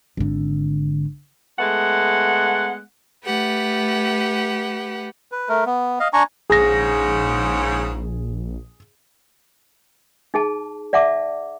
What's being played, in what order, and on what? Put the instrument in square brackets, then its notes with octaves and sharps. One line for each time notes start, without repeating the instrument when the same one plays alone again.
[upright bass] G#1 D3
[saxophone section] G#3 A3 B3 F#5
[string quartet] A3 G4 B4 F#5
[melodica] B4
A3 A#4
B3
D#5 F5
D4 G#5 A#5 C#6
[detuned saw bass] A#1 [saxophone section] G#2 C#3 [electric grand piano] G#4 A#6
[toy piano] D#4 G#4 A5
D5 E5 F#5 A5 D6